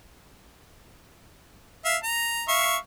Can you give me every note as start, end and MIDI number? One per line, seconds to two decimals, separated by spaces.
1.85 1.97 76
1.85 1.97 77
2.03 2.43 82
2.48 2.76 76
2.48 2.76 77
2.48 2.76 85